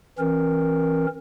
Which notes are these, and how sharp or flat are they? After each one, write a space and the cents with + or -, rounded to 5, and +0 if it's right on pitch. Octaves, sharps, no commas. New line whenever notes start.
E3 +0 C#4 -45 A#4 +0